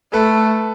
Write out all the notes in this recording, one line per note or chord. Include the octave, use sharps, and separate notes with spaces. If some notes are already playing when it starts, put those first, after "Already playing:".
A3 A4 B4